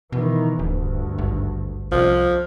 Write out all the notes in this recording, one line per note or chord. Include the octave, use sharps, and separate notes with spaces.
B2 D#3 E3
D1 D2 G2
G#1
C2 F3